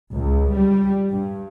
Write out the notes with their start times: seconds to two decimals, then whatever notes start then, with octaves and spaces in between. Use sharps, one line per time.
0.14 C#2
0.55 G3
1.11 G2